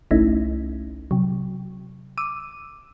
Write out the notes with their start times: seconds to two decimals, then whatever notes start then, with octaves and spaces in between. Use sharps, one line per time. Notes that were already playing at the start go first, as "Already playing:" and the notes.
0.11 G1 C2 A3 C#4 D#4 E4
1.11 C3 F#3
2.18 D6 E6 D#7